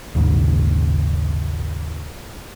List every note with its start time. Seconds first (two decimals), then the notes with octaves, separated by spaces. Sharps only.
0.15 A#1 D#2 G#2 C#3